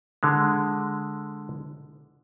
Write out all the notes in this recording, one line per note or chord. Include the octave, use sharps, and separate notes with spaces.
D3 G#3